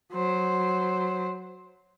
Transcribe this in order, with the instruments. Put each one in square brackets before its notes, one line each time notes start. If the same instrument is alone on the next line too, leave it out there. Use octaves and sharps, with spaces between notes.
[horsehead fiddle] F#3 C5